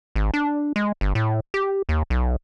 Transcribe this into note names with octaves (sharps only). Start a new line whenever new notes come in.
G#1
D4
G#3
G1
A2
G4
D#2
B1